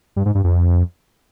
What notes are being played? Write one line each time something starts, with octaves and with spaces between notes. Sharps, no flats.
G2
G#2
G2
F2